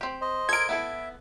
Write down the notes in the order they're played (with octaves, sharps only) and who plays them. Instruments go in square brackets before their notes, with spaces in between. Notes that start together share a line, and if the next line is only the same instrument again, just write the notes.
[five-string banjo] C4 G4
[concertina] C5 D#5
[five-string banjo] A4 A#4 [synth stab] G#6 D7
[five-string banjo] B3 E4 A4 [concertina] E5